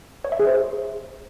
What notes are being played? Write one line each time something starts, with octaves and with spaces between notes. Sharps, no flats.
C#5
E5
G#4
C5